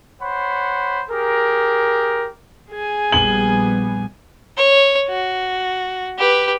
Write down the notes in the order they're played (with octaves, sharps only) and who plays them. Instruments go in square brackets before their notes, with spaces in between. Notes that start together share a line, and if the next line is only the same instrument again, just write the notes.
[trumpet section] C5 C#5 F#5 B5
G4 G#4 A#4
[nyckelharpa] G#4 G#5
[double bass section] A#1 G3 B3 [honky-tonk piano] F#7
[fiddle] C#5
F#4
G4 B4